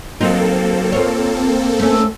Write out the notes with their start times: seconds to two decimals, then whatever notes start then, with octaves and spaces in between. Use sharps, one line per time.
0.20 F#3 A#3 C4 D#4 F4 A4
0.92 F4 C#5
1.80 A3 C#4